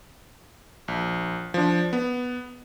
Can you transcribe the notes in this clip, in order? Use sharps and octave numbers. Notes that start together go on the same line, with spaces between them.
A#1
F3 D4
B3